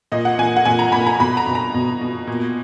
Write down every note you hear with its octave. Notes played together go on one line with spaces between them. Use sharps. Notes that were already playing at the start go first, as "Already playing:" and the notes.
A#2 D#5
F#5
A#2 G#5
F#5
A#2 G#5
A#5
A#2 B5
A#5
B2 B5
A#5
B2
A#5
B2
B2
A#2